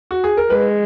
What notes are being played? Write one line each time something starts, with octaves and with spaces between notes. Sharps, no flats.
F#4
G#4
A#4
G#3 B4